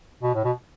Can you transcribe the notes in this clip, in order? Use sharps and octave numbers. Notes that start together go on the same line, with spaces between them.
B2
A2
B2